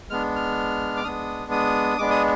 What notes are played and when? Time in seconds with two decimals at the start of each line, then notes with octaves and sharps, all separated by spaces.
0.10 G#3 B3 D4 F6
0.36 F6
0.97 D6
1.04 G#3 B3 D4 D#6
1.51 D#6
1.98 G#3 B3 D4 D6
2.10 D#6